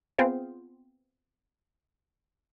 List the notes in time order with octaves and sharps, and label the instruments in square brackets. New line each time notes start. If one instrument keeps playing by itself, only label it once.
[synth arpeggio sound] B3 C4 F4 G#4 C5